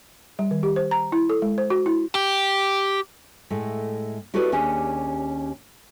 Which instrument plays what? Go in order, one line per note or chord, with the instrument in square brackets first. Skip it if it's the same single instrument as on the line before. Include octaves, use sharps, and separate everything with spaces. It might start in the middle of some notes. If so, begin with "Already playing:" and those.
[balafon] G3
D#3
G4
C5
A#5
E4
A4
G#3
C5
F#4
E4
[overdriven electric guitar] G4
[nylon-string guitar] A2 G#3 A3
E4 F#4 G4 A4 B4 D5
D#2 C#4 D4 G4 G#4